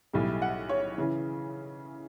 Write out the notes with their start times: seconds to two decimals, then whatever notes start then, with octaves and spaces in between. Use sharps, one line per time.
0.13 B1 A2 G3
0.42 F#5
0.69 C#5
0.98 C#3 E3